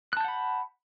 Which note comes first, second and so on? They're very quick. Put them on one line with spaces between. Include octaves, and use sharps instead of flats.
F#6 A5 G6 F#5 B5